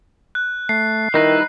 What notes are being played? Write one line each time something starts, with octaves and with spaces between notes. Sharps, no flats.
F#6
A3 C7
D#3 G3 D#4 E4 B4